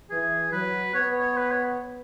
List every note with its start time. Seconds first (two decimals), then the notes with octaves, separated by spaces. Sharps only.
0.10 E3 G#4
0.52 F#3 B4
0.94 B3 C#5
1.19 C#5
1.37 B4
1.51 C#5